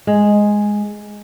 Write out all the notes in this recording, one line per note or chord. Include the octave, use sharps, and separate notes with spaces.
G#3